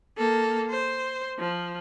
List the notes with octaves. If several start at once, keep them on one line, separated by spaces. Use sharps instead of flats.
A#3 A4
C5
F3